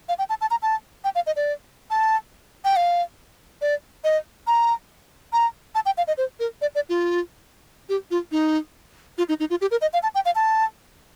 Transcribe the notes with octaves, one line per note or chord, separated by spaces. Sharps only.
F5
G5
A5
A5
A#5
A5
G5
F5
D#5
D5
A5
G5
F5
D5
D#5
A#5
A#5
A5
G5
F5
D#5
C5
A#4
D5
D5
F4
G4
F4
D#4
F4
D#4
D#4
F4
G4
A#4
D#5
F5
A5
G5
F5
A5